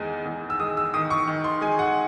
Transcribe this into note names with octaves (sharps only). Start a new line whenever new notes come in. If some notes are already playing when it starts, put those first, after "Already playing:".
Already playing: E2 D#3 G#3
E2
E6
G#3 D#6
E6
D#3 D#6
C#6
D#3
C6
G#3 G#5
F#5